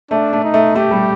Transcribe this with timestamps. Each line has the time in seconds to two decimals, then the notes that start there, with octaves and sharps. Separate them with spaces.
0.11 A3 D4
0.33 A3
0.44 D#4
0.54 A3
0.75 A3 G4
0.91 G3